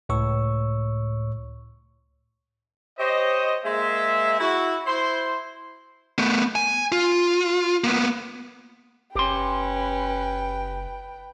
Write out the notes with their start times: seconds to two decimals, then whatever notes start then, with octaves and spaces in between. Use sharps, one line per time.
0.09 C#2 A2 C#5 C#6 E6
2.98 G4 C5 C#5 D#5
3.65 G#3 A#3 C5 E5
4.40 E4 F#4
4.86 E4 C5 C6
6.18 A3 B3
6.55 G#5
6.92 F4
7.84 A#3 B3
9.15 F#1 C#4 G4 B4 G5 C6